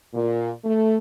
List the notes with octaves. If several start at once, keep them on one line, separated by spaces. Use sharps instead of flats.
A#2
A3